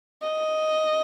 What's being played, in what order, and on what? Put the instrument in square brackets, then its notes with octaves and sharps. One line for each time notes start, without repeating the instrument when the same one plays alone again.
[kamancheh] D#5